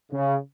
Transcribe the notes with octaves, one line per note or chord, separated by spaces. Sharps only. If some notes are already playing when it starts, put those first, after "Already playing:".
C#3